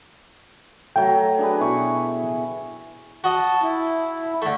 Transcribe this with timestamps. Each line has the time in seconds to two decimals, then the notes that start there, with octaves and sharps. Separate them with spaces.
0.96 F#3 A3 G5
1.39 D4 G#4 B4
1.60 B2 E4 C#6
3.24 F#4 D#5 A5
3.63 E4
4.42 D3 A3